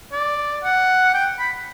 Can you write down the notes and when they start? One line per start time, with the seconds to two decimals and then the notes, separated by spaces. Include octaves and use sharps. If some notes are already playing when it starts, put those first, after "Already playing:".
0.12 D5
0.63 F#5
1.14 G5
1.39 B5